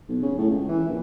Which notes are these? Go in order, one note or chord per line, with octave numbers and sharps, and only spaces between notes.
B1
C#3
A2
C#2
E3
A#1